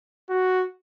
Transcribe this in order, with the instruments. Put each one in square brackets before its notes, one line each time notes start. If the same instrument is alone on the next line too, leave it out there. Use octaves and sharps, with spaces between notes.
[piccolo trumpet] F#4